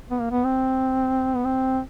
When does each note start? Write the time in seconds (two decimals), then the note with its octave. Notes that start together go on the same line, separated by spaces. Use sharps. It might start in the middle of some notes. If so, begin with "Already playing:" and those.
0.11 B3
0.20 A#3
0.31 B3
0.44 C4
1.36 B3
1.45 C4